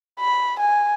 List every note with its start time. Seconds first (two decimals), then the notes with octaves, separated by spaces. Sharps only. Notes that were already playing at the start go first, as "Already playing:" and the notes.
0.20 B5
0.60 G#5